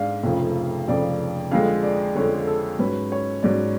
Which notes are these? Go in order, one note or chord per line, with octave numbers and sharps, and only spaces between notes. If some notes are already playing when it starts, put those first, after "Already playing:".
Already playing: G#2 G#3 D4 F5
F1 F2 C#3 F3
F1 F2 C#3 F3 D5
F2 D3 G#3 F5
D5
F2 D3 G#3 C#5
A4
G#2 F#3 C#4 B4
C#5
G#2 F#3 C#4 D5